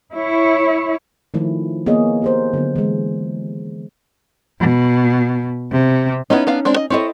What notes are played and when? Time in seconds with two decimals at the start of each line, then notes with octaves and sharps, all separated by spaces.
0.14 E4 C#5
1.34 D#3 F3 A3 E4
1.86 A#3 B3 G#4 C#5 D#5
2.22 G4 A#4 C5
2.53 D3 F#3 B3
2.76 E3 G#3
4.60 B2
5.71 C3
6.30 B3 C#4 D#4 E4 D#5
6.47 B3 D4 F5
6.65 G#3 C4 D4
6.76 D#5
6.90 C4 E4 A4 C#5 D#5